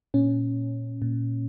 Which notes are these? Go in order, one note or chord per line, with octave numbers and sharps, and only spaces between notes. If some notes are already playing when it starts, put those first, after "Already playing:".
A#2 C#4
A#2